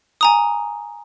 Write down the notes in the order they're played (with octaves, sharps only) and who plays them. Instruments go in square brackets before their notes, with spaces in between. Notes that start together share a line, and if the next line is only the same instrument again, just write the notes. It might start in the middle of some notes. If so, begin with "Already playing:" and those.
[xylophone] G#5 A#5 D#6